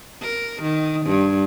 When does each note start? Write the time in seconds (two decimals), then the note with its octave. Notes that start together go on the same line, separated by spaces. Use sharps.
0.23 A#4
0.63 D#3
1.06 G2